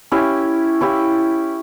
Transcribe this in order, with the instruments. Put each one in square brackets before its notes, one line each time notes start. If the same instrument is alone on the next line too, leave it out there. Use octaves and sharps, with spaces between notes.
[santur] C#4 E4 G4
C#4 E4 G4